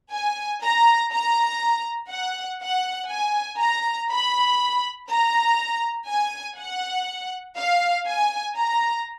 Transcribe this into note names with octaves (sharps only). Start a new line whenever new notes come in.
G#5
A#5
A#5
F#5
F#5
G#5
A#5
B5
A#5
G#5
F#5
F5
G#5
A#5